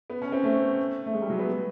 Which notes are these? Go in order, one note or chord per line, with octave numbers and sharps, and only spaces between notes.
B3
C#4
C4
A3
A3
G#3
G3
F#3
B3